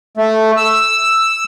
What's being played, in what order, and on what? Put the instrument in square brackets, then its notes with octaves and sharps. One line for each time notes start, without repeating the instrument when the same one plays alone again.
[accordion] A3
E6